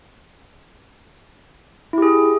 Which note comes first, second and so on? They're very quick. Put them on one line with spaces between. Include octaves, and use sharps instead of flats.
E4 G4 G#4